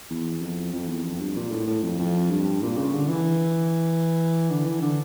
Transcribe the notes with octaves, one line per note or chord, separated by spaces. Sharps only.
E2
F2
F2
E2
F2
G2
A#2
A2
A2
F2
F2
G2
A#2
C#3
D3
E3
D3
E3
D3